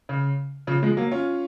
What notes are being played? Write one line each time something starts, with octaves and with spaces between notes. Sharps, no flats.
C#3
C#3 F3
F3 G#3
F#3 A#3
C#4 F4